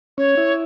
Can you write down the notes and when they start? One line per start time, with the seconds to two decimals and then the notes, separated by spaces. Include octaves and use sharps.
0.18 C#4 C#5
0.37 E4